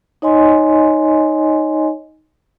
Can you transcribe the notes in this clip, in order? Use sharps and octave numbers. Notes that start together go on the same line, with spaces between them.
D#4 C#5 D#5 G#5 C6